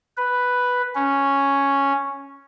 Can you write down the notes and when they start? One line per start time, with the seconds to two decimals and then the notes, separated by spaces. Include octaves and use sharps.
0.17 B4
0.95 C#4